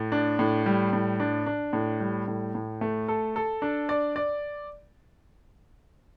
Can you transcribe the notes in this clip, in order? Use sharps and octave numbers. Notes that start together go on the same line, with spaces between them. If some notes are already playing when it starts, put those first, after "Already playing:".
Already playing: A2
D4
A2
G3
A2
D4
D4
A2
G3
A2
A2
A3
A4
A4
D4
D5
D5